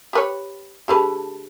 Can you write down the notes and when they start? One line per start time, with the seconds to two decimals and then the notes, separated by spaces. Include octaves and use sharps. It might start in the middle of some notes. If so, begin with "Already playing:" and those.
0.13 G4 B4 C#5
0.88 D3 A3 G4 G#4 B4 A5